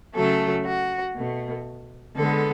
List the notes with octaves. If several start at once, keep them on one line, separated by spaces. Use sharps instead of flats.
C#3 F#3 A3 A4
F#4
B2 A3
D3 G#3 B3 A4